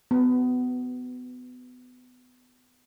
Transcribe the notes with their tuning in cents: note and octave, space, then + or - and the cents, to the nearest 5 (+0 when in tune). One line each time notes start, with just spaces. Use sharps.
B3 +25